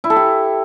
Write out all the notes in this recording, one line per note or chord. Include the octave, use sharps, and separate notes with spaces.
E4
A4
G4